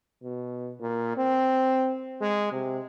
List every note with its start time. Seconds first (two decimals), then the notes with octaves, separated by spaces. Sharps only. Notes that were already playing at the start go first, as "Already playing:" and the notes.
0.22 B2
0.80 A#2
1.17 C4
2.21 G#3
2.52 C3